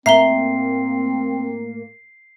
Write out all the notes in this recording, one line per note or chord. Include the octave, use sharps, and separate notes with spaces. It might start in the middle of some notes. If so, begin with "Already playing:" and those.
A2 A#3 C4 E5 A#5 C7 G7